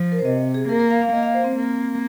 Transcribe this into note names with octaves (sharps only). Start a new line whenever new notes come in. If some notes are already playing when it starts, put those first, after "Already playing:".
Already playing: F3
A#4
C5
C3 D#5
G#4
A#3 A#4
A#4
F5
F5
A#3 D#5
F5
C5
C4
A#3